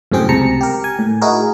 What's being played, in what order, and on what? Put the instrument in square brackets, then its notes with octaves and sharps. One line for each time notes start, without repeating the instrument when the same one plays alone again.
[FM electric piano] F#2 A2 C3 C4 G#4 G5
C#2 C3 A5 A#5 C#7
G4 A#4
G#5
A2
D#4 E4 F#4 G#4 A#4